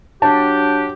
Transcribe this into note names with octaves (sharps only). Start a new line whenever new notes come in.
F#3 D4 G4 A5